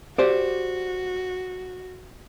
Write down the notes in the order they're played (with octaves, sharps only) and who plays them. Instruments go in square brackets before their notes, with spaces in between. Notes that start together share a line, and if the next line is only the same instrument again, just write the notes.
[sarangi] F#4 [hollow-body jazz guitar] G4 C5 D5